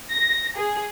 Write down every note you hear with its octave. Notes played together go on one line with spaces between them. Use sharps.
A#6
G#4